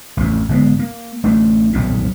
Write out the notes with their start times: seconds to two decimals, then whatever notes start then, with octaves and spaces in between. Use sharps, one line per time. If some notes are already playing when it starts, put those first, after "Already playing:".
0.17 A1 F2
0.48 G#1 D3 G#3 B3
0.79 A#3
1.24 A1 A3 D4
1.73 D#1 B1 F2 G#2